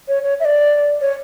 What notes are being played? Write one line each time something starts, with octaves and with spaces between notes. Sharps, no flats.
C#5
C#5
E5
D5
C#5